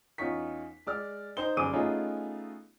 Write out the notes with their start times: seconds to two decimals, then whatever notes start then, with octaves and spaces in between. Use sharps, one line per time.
0.18 E2 C#4 D#4 F4 C#6 B6
0.87 G#3 D5 F6
1.37 D#4 C5 G7
1.57 G1 F#2 G#4 D6 D#7
1.73 A3 B3 C#4 D#4 F4 G#4